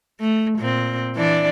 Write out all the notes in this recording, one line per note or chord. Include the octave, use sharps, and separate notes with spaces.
A3
A#2 C4
E3 D4 D5